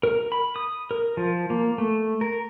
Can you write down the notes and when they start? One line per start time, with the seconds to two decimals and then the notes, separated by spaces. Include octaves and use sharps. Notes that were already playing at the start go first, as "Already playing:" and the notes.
0.03 A#4
0.32 B5
0.56 D#6
0.91 A#4
1.17 F3
1.50 A#3
1.78 A3
2.21 A#4